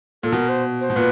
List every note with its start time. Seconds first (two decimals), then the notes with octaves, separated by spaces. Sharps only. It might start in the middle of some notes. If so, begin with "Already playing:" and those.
0.23 A#2 A4
0.32 B2 A#4
0.49 C5
0.80 C5
0.90 B2
0.96 A#2 B4